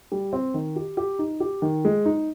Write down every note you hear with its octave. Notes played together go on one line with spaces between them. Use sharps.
G3
C4
D#3
G4
G4
D#4
G4
D#3
G#3
D#4